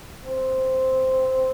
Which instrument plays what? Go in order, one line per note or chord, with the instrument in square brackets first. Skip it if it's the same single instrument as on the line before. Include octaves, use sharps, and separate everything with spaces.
[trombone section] C4